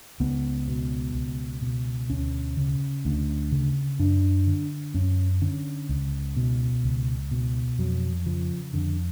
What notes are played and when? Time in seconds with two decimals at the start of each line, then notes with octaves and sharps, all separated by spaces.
0.20 C#2 B3
0.68 B2
1.15 C#2
1.62 B2
2.10 D2 C#4
2.57 C#3
3.05 D2
3.52 C#3
3.99 F#2 D4
4.47 D3
4.94 F#2 C#4
5.41 D3 C#4
5.89 C#2
6.37 B2
6.84 C#2
7.31 B2
7.79 F2 F#3
8.26 C#3 F3
8.73 F2 D3